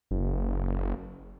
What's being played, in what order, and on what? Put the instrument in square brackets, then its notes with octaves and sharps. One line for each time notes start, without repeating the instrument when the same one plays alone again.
[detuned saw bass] F#1